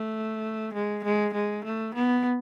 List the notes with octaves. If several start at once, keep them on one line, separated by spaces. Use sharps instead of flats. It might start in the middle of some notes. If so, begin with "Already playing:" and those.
Already playing: A3
G#3
G#3
G#3
A3
B3